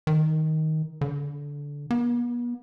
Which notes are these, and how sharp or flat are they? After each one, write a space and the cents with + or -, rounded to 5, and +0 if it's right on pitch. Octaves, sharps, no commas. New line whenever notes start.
D#3 +10
D3 -20
B3 -40